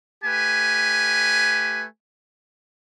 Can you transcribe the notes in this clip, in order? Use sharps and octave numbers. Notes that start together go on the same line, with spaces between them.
A3 G4 B4 G#5